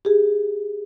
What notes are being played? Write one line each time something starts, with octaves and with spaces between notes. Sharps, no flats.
G4 G#4